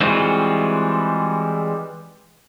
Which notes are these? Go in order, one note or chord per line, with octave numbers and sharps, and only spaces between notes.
E3 G3 G#3 C4 F4 F#4